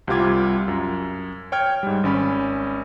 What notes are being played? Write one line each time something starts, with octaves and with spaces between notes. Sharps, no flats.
C2 C3 G3 F4 D6 G#6
F#2
C#5 G5 F6 G#6
G#2 G3
G#1 C#4 B5